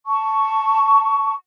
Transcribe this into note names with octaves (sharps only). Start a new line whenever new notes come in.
A5 C#6